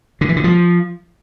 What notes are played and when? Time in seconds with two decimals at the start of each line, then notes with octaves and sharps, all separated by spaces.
0.21 D3
0.29 E3
0.36 D3
0.44 F3